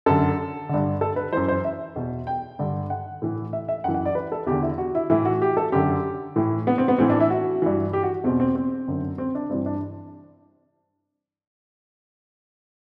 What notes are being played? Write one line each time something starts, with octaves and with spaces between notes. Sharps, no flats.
F#2 D3 A4
G2 D3
A4
B4
F#2 E3 C5
C5
E5
E2 B2
G5
G2 D3
F#5
A2 E3
E5
E5
F#2 E3 F#5
F#5
D5
B4
A4
E2 D3 G4
E4
F#4
E4
A2 E3 E4
F#4
G4
A4
F#2 D3 G4
A2 E3
B3
C4
B3
A2 E3 C4
D4
E4
F#4
G2 E3
G4
F#4
E2 B2 C4
C4
C4
F#2 D3
C4
D4
G2 E3 C4
D4